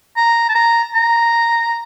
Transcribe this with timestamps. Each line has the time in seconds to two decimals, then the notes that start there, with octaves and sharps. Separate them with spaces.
0.17 A#5
0.49 A5
0.55 A#5
0.95 A#5